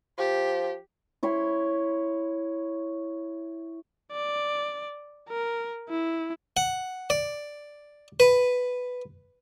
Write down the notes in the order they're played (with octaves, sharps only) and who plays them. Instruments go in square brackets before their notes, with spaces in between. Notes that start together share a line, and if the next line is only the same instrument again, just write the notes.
[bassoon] F3 [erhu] G4
[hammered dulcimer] E4 C#5 B5 C6
[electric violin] D5
A#4
E4
[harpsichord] F#5
D5
B4